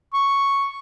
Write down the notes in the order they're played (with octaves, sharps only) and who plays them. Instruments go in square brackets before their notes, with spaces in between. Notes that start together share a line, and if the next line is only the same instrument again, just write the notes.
[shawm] C#6